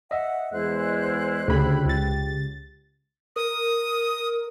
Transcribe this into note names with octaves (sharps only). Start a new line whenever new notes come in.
D#5 E5 F#5
E2 G#3 E4 C5 F#6
D2 C#3 G4 B5
C#2 A6
A#4 D#6